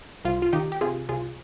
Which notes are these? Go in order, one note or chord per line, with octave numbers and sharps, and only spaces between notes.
C2 F4
F4
D#3 D#4 G4
G4
C3 F4 G#4
C2 F4 G#4